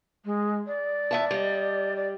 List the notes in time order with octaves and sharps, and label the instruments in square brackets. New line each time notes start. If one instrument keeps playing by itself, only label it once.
[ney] G#3
D5
[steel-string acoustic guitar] E2 E5 A5
G3 D#5
[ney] D5